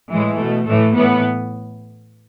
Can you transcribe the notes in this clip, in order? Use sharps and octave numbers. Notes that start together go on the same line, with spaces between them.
A2 E3 G#3
B2 A3
A2 E3 A3
A2 E3 B3